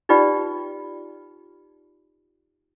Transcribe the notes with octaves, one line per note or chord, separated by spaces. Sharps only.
D#4 F4 G4 B4 D5 G5